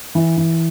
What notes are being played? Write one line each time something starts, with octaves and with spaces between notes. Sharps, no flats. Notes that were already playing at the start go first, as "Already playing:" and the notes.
E3
E3